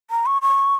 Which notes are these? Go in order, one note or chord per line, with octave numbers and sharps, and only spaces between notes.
A#5
C#6
C#6